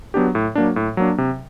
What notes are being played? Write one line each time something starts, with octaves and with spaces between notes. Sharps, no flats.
F#3 B3 D4 G4
A2
F#3 A#3 D4
A2
F#3 A#3 D4
C3